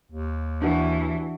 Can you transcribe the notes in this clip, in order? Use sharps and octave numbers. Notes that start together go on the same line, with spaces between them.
D#2
E3 D4 F#4